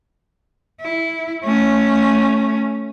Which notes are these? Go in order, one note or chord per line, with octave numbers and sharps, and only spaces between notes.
E4
A3 C#4